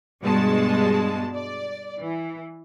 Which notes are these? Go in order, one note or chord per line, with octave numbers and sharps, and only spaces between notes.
G2 B2 G#3 A5
D5
E3